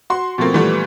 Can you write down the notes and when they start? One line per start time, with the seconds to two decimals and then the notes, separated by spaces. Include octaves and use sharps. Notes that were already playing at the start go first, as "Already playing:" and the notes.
0.10 F#4 C6
0.38 B2 F3 A3 A#3 C4
0.54 A#2 E3 F3 G3 A3 B3